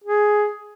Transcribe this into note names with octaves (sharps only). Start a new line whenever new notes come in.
G#4